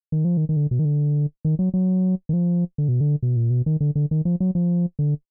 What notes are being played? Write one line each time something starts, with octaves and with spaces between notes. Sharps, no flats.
D#3
F3
D#3
D#3
D3
B2
D#3
D3
D#3
F#3
F#3
D#3
F3
D3
B2
D3
B2
A#2
B2
D#3
D3
D3
D#3
F3
F#3
F3
D3